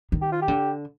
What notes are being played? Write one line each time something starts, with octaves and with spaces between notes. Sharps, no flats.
D#3
G4
F4
G4
D3